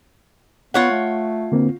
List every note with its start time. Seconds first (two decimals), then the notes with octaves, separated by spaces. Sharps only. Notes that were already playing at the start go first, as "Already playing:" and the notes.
0.74 B3 F4 C#5 F#5
0.91 A3
1.52 D3 A#3 C4